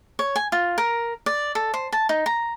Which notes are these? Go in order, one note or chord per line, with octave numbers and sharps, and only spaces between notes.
C#5
G#5
F4
A#4
D5
A4
C5
A5
D#4
A#5